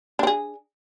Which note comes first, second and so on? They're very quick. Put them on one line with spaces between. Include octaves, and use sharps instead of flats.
D4 C4 G#4